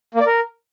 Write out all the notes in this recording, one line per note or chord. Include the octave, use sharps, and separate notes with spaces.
A#3
D5
A#4